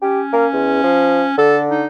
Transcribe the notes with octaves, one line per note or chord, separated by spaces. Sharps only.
C#4 G4
A#3
E2
F3
D3 A4
D#4